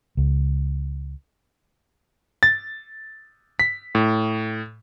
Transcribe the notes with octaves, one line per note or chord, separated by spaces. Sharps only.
C#2
A6
B6
A2